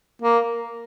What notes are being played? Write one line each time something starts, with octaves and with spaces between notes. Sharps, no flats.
A#3